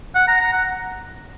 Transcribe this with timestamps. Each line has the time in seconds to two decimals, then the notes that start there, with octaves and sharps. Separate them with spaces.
0.15 F#5
0.28 A#5
0.41 A#5
0.53 F#5